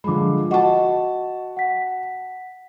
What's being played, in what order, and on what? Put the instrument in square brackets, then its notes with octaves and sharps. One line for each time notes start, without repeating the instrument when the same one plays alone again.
[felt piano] D3 F3 G#3 [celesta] B5 D6
[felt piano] F#4 A5 [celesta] D#5 F#5 C#6
[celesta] F#5 B6